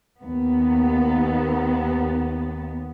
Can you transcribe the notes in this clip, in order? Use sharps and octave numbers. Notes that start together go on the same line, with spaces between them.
D#2 B3